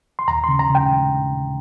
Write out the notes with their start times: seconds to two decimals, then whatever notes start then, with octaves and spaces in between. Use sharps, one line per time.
0.19 C6
0.28 D#2 A#5
0.44 C#3 C6
0.59 A#5
0.70 C#3
0.75 G5